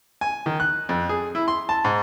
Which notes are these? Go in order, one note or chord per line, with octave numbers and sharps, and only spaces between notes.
G#5
D#3
F#6
F2
G#4
E4
C6
A5
G#2